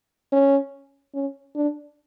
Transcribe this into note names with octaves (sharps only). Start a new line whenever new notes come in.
C#4
C#4
D4